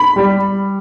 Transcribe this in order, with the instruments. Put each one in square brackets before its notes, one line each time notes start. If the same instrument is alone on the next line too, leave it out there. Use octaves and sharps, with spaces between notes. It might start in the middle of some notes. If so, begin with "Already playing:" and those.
Already playing: [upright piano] B5
G3